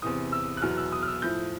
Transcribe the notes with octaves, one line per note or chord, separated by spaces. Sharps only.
E2 C3 E3 D#6
E6
F#6
E2 B2 F#3 F6
E6
D#6
F6
E6
A2 F3 G6